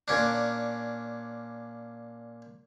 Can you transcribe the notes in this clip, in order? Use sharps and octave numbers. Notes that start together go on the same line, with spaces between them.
A#2 C#4 D4